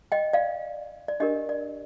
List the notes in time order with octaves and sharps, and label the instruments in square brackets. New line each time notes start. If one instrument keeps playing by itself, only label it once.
[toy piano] D#5 G5
D5 F5
D5
D4 G4 A#4 D#5
D5